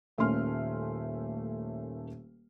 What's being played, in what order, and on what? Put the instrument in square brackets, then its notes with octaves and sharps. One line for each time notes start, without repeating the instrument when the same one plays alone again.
[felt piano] D#1 A3 A#3 C#4 C6 F6